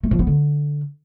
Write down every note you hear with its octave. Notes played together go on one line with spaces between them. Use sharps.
A3
F3
B3
D3